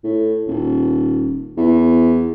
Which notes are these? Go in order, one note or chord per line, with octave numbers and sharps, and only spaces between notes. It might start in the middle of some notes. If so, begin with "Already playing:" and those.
A2
D#1
E2